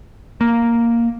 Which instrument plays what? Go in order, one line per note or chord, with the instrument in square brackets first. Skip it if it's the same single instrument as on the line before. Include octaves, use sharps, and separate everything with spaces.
[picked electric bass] A#3